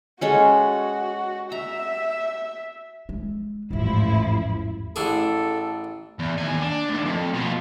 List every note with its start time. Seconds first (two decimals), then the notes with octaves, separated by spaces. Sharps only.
0.21 G#3 C#4 F#4 A4
1.52 E5 A#5
3.09 G#3
3.71 A1 E2 G#2 F3 E4
4.96 A1 D4 G#4 A4
6.19 E2
6.38 D#2 G#5
6.61 D4
6.89 D2 D#3
7.05 F2
7.33 B2 F4